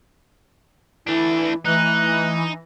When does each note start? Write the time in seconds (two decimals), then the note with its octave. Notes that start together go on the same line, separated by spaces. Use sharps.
1.07 E3 A3 D4 E4
1.66 E3 A3 D#4 F#6